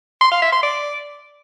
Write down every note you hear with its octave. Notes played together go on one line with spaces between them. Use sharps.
C6
F5
E5
C6
D5